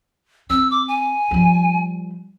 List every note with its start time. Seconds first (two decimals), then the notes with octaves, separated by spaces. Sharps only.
0.50 C4 E6
0.71 D6
0.88 G#5
1.31 F3 G3